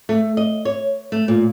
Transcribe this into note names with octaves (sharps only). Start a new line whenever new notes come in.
A3
D#5
C#5
A3
A#2